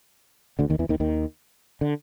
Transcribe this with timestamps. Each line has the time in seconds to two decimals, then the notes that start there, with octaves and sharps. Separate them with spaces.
0.59 D2 D3
0.70 D#2 D#3
0.79 E2 E3
0.89 D#2 D#3
1.00 D#2 D#3
1.81 D3